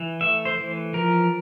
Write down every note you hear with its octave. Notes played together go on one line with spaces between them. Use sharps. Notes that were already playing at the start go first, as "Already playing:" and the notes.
Already playing: E3
A3 E5
C5
E3
F3 A#4